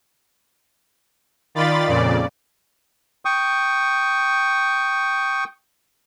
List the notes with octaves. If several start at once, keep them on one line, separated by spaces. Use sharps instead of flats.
D#3 F4 D5 B5 A6
F2 A#2 C#3 D5
G5 C#6 D#6